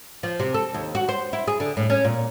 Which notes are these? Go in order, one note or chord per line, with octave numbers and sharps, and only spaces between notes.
F3
C3
A4
D#2
F#4
C5
E4
G#4
D3
A2
C#4
A#2